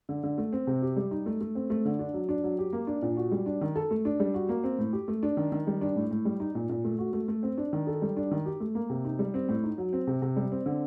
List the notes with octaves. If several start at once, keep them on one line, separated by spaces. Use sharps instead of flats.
D3
D3
A3
C4
C3
G4
G3
D#4
A3
A3
C4
A3
D3
D4
F#3
D4
F#3
G4
A#3
D4
A#2
F#4
G3
D4
D#3
A4
A3
D4
G3
F#4
A#3
C4
A2
G4
A3
D4
D#3
D#3
G3
D4
A2
A2
G3
D#4
A#2
A#2
A3
F#4
A3
A3
C4
D4
D#3
A4
G3
D4
D#3
G4
A3
A#3
C3
D#4
G3
C4
A2
D#4
F#3
C4
C3
C3
G3
C4
D3